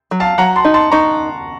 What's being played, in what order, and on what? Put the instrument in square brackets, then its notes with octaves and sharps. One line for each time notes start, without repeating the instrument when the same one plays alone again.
[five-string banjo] F#3
[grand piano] F5 A5
[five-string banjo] F#3 [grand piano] F#5 A#5
[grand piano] A5 C6
[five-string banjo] D#4
[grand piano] A5 C6
[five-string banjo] D#4 [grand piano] A#5 C#6